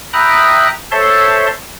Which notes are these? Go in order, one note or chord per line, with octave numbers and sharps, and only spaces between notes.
E5 G5 A#5 B5 D#6 F#6
A4 C5 C#5 E5 A5 C6